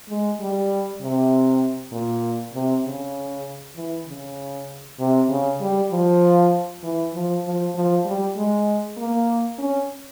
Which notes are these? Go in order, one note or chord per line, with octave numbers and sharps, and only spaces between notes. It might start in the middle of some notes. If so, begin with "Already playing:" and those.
G#3
G3
C3
A#2
C3
C#3
E3
C#3
C3
C#3
G3
F3
E3
F3
F3
F3
G3
G#3
A#3
C#4